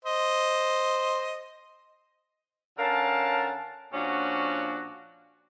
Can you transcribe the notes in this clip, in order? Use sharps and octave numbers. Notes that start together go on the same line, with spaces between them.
C5 D#5
D3 C#4 A#4 F5 A5
A#2 F3 C#4 D4 F#4